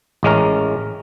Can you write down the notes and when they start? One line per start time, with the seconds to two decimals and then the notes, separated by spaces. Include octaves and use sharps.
0.23 A1 G#3 C#4 A#4